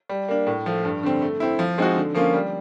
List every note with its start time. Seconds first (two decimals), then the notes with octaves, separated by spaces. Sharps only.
0.09 G3
0.28 A#3 D4
0.47 A2
0.66 F3 A3
0.85 G2
1.03 D3 G3 C4
1.22 A3
1.40 C4 E4
1.59 F3
1.78 G#3 C4 D#4 F#4
1.96 D3
2.14 F3 A#3 C#4 F4
2.34 G3